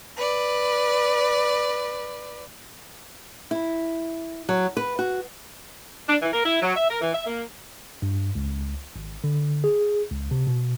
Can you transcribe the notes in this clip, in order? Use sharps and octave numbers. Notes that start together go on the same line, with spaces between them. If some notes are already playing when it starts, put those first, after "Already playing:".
B4 D5
E4
F#3
B4
F#4
D4
E3
A#4
E4
F#3
E5
A#4
E3
E5
A#3
G2
C#2
G#1
D3
G#4
C#2
C3
B2